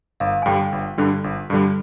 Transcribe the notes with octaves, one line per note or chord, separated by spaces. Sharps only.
G1 F5
G#5
G2 D3 G3 G5
G1
G2 D3 G3
G1
G2 D3 G3